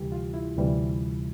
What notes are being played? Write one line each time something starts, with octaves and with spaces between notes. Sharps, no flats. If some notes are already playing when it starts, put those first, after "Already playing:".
Already playing: D2 C3 E3 G3 G4
F4
E4
D2 C3 E3 G3